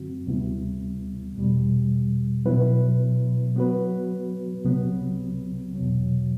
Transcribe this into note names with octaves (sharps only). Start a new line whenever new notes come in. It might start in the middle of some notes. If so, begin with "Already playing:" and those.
Already playing: F#2 D3 F#3 C4 F#4
D2 C3 G3 B3 E4
E2 B2 G3
B2 F#3 B3 E4 B4
F#3 B3 F#4 B4
C2 C3 F#3 B3
E2 B2 F#3